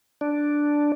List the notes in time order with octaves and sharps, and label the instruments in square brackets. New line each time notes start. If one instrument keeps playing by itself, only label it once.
[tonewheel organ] D4